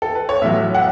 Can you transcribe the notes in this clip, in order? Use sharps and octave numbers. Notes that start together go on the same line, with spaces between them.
A4
B4
C#5
A1 A2 F#3 E5
F#5